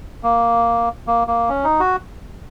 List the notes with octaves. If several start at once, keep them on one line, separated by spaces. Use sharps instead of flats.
A#3
A#3
A#3
C#4
D#4
F#4